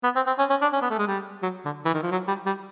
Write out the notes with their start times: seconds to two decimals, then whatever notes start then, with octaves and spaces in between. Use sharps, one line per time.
0.04 B3
0.16 C4
0.27 C4
0.39 C#4
0.50 C#4
0.62 D4
0.73 C#4
0.82 B3
0.90 A3
0.99 G#3
1.07 G3
1.43 F#3
1.65 D3
1.85 E3
1.94 D#3
2.03 F3
2.12 F#3
2.28 G3
2.46 G3